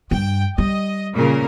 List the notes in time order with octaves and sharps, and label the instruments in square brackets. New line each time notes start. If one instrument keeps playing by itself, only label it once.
[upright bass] G2 [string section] G5
[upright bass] G3 [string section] D#5
[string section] A#2 C#3 A#4